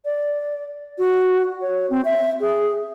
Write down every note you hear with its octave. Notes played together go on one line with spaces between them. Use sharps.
D5
F#4
C#5
C4
E5
G#4